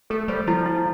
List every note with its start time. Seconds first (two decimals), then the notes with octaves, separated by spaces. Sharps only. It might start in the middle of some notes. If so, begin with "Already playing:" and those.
0.10 A3 A4
0.28 G3 C5
0.47 F3 E4
0.66 E4